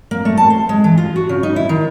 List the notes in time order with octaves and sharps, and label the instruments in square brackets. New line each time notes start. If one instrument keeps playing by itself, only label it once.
[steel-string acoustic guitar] A#3
A3
A5
C5
G#3
E3
F4
F#4
C#3
D#4
E4
D#3